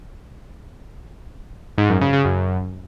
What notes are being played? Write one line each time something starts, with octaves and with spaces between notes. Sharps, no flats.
G#2
F#2
C#3
C#3
F#2